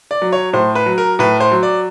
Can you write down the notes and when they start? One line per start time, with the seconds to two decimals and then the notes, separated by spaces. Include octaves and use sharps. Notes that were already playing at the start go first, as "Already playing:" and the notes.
0.11 D5
0.22 F#3
0.33 C#5
0.53 A2 C5
0.75 B4
0.86 F#3
0.98 A#4
1.19 A2 B4
1.40 C5
1.51 F#3
1.63 D5